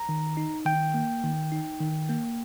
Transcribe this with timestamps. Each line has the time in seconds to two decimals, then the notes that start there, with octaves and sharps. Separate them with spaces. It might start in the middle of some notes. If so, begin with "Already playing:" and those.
Already playing: A#5
0.09 D#3
0.37 D#4
0.66 D#3 G5
0.94 A#3
1.24 D#3
1.52 D#4
1.80 D#3
2.09 A#3